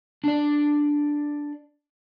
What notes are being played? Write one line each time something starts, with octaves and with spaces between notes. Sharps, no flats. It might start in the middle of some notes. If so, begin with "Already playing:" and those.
D4 D5